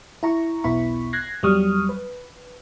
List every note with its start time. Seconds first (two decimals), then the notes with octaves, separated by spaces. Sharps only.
0.23 E4 A#5 C#6
0.64 B1 E2 B3 E4 B5 C#6
1.13 F#6 G#6 A#6 C7
1.43 E2 F#3 G3 C#6 D#6 F6
1.89 B4